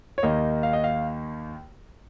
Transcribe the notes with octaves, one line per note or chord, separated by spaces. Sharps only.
C#5
D#2 D#3 A#3 D#5
F5
D#5
F5